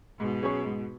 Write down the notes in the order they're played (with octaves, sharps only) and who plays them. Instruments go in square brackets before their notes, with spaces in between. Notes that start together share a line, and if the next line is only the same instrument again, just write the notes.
[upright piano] G#2 [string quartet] B2
[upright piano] F#3 C#4 G#4 C#5
G#2